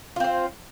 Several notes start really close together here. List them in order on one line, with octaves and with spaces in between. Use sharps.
F4 C4 C5